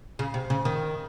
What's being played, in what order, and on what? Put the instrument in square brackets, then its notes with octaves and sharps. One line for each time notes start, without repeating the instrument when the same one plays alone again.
[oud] C#3
C3
C#3
D#3